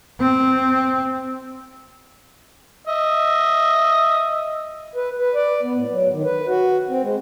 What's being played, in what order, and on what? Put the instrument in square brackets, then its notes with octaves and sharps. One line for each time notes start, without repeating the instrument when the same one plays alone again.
[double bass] C4
[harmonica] D#5 E5
[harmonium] B4
B4
D5
B3
A2
F#3
D#3
B4
F#4
C4
G#3